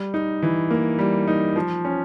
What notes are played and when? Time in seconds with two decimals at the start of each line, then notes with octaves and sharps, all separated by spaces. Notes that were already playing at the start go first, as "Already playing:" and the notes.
Already playing: G3
0.14 D#4
0.43 E3
0.71 A#3
0.99 G3
1.28 D#4
1.56 F3
1.85 C#4